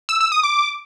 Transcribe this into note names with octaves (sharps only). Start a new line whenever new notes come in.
E6
E6
D#6
D6